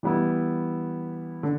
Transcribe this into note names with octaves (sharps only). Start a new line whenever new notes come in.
E3 G3 B3 E4
D3